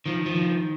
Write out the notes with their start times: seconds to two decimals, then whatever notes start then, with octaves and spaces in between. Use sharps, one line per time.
0.06 D#3 F3
0.26 F3
0.35 D#3